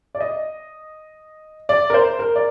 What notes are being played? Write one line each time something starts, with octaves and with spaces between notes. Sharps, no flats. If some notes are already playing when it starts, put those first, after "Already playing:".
D5
D#5
D5
A#4
C5
A#4
D5